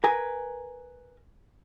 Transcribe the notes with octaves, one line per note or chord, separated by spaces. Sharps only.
A#4 B4 G#5